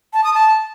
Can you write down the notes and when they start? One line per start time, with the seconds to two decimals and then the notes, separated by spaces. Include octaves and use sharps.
0.13 A5
0.24 D#6
0.34 A5